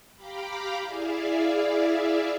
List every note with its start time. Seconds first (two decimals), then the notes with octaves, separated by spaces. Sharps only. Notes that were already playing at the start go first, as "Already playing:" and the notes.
0.16 G4 F5 G5 A#5 B5 D6
0.81 E4 G#4 D5 E5 F5